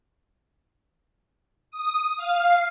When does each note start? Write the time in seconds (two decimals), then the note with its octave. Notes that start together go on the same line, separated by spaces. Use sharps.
1.71 D#6
2.17 F5